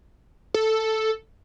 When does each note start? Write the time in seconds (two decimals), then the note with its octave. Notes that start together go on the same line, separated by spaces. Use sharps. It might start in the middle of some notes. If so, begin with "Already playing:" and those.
0.54 A4